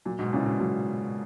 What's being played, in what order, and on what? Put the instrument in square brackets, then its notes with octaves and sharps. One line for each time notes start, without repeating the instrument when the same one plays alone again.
[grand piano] A#2 [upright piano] F#3
[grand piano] G#2 B2
[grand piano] A#2 C#3 [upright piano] C#4 E4
[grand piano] G#2 B2
[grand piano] A#2 [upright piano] F#3